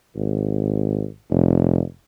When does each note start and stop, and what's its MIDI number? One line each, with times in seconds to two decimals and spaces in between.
0.15 1.05 32
1.30 1.81 29